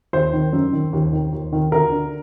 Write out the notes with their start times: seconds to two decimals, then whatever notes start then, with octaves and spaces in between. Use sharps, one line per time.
0.13 D#2 C5
0.33 D#3
0.53 F#2
0.73 D#3
0.93 D#2
1.13 D#3
1.33 D#2
1.52 D#3
1.72 D2 A#4
1.92 D3